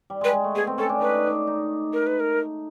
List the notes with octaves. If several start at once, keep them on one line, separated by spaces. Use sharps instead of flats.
G3
G#3 B4
G#3
A3
B3 G#4
C4
C#4 A4
D4
D#4 B4
D4
D#4
D4
D#4
A#4
B4
A#4